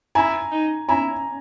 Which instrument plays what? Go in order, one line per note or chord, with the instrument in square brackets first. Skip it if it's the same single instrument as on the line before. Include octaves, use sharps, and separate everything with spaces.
[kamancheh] E4 [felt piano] G#5 A#5
[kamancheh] D#4
[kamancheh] E4 [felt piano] G#5 A#5